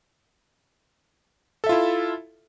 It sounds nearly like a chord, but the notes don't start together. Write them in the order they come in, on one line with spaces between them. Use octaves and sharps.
A4 E5 F4 E4